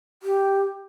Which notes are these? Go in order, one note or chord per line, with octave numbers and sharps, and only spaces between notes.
G4